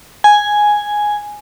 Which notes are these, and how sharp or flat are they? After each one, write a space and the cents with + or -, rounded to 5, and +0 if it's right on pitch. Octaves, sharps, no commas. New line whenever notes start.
G#5 +0